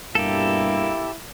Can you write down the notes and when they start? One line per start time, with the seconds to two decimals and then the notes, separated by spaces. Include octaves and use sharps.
0.15 G2 B2 G3 A#3 E4 G4 A4